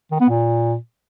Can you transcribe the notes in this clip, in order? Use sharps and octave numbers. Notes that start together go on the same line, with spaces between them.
D#3
B3
A#2